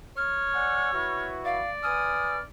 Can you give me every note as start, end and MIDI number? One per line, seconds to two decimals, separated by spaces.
0.17 1.34 73
0.17 1.24 89
0.54 0.90 74
0.54 0.90 78
0.54 0.90 80
0.93 1.62 64
0.93 1.62 66
0.93 1.62 71
1.45 2.43 74
1.45 1.71 77
1.83 2.38 71
1.83 2.38 80
1.83 2.38 87
1.83 2.40 89